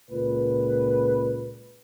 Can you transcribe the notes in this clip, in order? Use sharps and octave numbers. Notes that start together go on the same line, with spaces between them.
C#2 A#2 B4